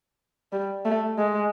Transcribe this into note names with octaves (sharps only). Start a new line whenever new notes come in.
G3
A3
G#3